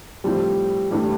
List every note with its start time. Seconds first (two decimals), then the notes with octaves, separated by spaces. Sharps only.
0.24 A2 F3 G3 C4
0.91 G2 E3 G3 A3